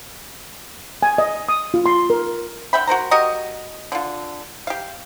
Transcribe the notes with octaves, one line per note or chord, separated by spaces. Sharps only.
G#5
D#5
D#6
F4
C6
A#4
D3 E5 G5 B5
F#4 A#4 C5 A#5
F#4 G4 A#4 D#5
D3 F4
G4 F5